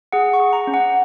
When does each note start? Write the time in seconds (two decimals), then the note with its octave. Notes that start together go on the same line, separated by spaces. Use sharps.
0.12 G#4 F#5
0.33 C#6
0.40 G#4
0.53 A#5
0.67 C#4
0.74 F#5